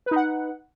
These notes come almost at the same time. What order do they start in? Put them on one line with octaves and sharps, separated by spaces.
B4 D#4 F#5